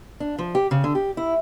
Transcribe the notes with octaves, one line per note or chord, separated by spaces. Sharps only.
D4
F3
G4
C#3
D3
G4
E4